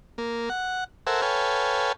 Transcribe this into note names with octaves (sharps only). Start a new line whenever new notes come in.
A#3
F#5
A4 A#4 C5 E5 F#5 G#5
A4 B4 C#5 F5 G5 G#5